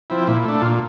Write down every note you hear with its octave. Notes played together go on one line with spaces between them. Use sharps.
F3 C4 E4
A#2 E4
A3 D4
A#2 F4